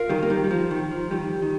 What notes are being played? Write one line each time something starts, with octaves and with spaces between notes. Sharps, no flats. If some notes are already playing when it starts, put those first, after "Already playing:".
Already playing: F4 A#4 F5
D#3 G3
A#3
D#3 G3
G3
F3
D#3
F3
D#3 G3
D#3